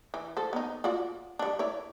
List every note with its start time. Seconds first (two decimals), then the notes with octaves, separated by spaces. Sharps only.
0.14 E3
0.37 A4 C5
0.53 B3 D#4
0.84 F4 F#4 D5
1.39 G3 D4
1.59 E4 C#5 D5